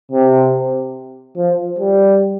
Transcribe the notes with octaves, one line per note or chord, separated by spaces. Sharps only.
C3
F3
G3